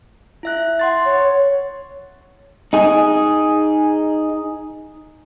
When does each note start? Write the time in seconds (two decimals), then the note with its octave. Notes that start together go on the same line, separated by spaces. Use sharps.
0.43 E4 E5 F#6
0.79 F#5 C6 A6
1.05 C#5
2.73 D#4 G#4